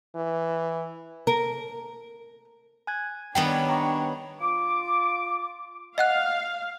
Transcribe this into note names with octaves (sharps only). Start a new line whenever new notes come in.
E3
A#4
G#5 F#6 G#6
D#3 G3 B3 D4 C#5 G5
A#5 C#6
F4 D6
D#5 F5 F#5 F#6